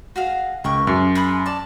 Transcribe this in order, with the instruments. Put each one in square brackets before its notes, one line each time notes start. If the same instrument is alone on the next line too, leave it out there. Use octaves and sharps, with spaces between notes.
[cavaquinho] F#4 G#4 F5
[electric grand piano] C#2 [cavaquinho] A#4 G5 C#6
[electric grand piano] F#2 [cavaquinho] G#4
[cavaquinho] G#4 B5 D#6
D5 A5